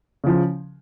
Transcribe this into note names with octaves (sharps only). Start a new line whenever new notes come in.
C#3 F3